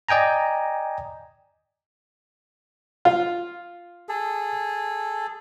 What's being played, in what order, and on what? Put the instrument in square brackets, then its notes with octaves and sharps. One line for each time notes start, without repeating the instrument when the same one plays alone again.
[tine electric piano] D5 D#5 G5 G#5 A#5
[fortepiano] F4
[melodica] G#4 A4